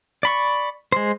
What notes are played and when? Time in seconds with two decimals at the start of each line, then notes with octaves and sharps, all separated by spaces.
0.23 D5 B5 C#6
0.92 G#3 C5